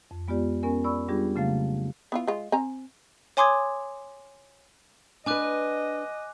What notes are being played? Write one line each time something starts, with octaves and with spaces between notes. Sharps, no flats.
F2
G#3 B3 F4 G4 D5
B3 C#4 A#4 G#5
D5 B5 C#6 E6
G3 B3 D4 F4 G4 G#4
C#3 F#3 A3 A#3 F5 A6
B3 E4 F4
G#3 F4
C4 G#5 A#5
C#5 G#5 C6 D6 D#6 G#6
D4 B4 D#5 G#5 D6 F#6